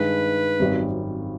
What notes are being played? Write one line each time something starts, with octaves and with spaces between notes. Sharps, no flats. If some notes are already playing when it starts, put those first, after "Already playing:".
Already playing: G2 D#3 G#3 B4
G#1 F#2 D#3 G3 C4